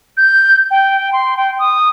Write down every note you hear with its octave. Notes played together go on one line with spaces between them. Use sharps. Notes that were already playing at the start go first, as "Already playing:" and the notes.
G6
G5
C6
G5
D#6